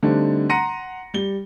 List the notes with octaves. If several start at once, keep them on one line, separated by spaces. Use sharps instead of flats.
D3 G3 A3 C4 D4 D#4
F#5 A#5 C6 A#6 C#7 D#7
G3 G7